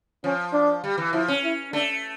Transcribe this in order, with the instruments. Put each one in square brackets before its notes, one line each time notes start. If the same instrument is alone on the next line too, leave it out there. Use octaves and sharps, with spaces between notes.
[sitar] F3 [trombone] C#4
[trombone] D4
[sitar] G3
E3
[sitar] F3 [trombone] E4
[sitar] C#4
[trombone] E4
[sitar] A3 [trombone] D4